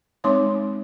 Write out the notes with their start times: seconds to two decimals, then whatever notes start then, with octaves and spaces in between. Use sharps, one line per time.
0.24 G#3 C4 D#4 C#5 C6 D6